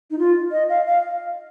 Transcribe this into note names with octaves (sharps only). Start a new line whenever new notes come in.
D#4
F4
D#5
F5
F5